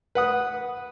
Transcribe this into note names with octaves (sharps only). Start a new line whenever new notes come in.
B4 F#5 D#6